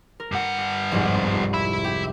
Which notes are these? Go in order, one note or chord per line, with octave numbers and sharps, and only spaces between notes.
A#4
G2 F#5
F1 C2 G#2
E5 B5
G4